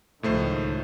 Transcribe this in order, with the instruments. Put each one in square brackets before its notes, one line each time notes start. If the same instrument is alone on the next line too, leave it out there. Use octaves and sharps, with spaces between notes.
[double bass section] C#2 D#3 F3 [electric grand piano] A2 A3 C5